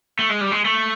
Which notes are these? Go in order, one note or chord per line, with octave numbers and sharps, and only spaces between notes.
A3
G#3
G3
G#3
A3